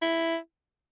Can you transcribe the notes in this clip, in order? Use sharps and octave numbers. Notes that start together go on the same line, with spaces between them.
E4